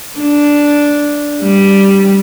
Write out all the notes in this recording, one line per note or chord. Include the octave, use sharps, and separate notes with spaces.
D4
G3